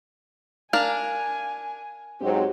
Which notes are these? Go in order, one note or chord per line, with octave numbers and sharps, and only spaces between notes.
D4 A#4 F5 G#5
G#2 F#3 C4 G4